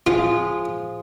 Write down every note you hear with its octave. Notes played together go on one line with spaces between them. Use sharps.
F3 G#3 F4